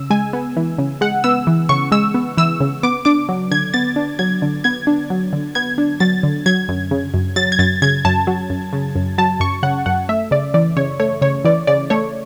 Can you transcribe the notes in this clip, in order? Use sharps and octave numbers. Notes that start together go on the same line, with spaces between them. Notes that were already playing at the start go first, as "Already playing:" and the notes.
Already playing: C#3 E6
G#3 G#5
B3
E3
C#3
G#3 F#5
B3 E6
E3
C#3 C#6
G#3 E6
B3
E3 E6
C#3
B3 D6
D4 D6
F#3
D3 G#6
B3 A6
D4
F#3 G#6
D3
B3 G#6
D4
F#3
D3
B3 G#6
D4
F#3 A6
D3
F#3 G#6
F#2
C#3
F#2
F#3 A6
G#6
F#2 A6
C#3 G#6
F#2 A5
F#3
F#2
C#3
F#2
F#3 A5
F#2 C#6
C#3 F#5
F#2 F#5
A3 E5
C#3 D5
E3 D5
C#3 C#5
A3 C#5
C#3 C#5
E3 D5
C#3 D5
A3 C#5